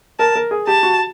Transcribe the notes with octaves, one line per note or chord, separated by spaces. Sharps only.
A#4 A5
A#4
G#4
G4 A5
F#4